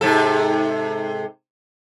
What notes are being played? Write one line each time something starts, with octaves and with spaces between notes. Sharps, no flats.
G#2 C3 A4